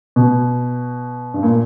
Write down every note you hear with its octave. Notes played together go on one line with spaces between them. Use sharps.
B2
G2
A#2